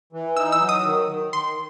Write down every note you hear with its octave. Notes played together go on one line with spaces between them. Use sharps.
E3
D#4 E6
E6
F#3
D#6
D#3
D#3
D#3 C6